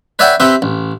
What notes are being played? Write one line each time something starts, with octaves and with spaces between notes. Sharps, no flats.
B4 C#5 D5 E5 F#5 G5
C4 G4 B4 E5
A1